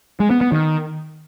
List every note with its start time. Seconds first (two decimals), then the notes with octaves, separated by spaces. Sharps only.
0.20 G#3
0.30 B3
0.41 B3
0.52 D#3